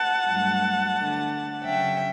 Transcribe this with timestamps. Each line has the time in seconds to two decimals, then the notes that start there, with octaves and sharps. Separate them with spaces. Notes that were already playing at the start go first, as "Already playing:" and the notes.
Already playing: F#5 A5
0.26 G2 F#3 A3
0.96 D3 A3 D4
1.64 C#3 F#3 C#4 E5 G5